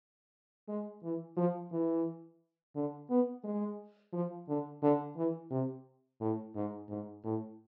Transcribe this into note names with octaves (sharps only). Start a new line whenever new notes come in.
G#3
E3
F3
E3
D3
B3
G#3
F3
D3
D3
E3
C3
A2
G#2
G#2
A2